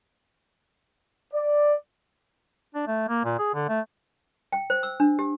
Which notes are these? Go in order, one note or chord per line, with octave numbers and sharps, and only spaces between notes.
D5
D4
A3
A#3
A#2
G#4
D3
A3
G5
C5
E6
D4
G4